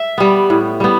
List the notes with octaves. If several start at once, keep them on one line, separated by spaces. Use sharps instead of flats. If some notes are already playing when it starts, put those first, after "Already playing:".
Already playing: E5
G3 B3
A2
G3 B3